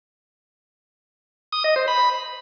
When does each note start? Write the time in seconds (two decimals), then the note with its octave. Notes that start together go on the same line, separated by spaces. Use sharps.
1.52 D#6
1.64 D#5
1.76 C5
1.88 B5